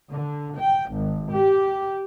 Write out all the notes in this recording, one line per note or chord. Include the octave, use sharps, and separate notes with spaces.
D3
G5
G#1
G4